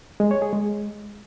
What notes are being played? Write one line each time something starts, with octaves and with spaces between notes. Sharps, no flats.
G#3
C#5
G#4
G#3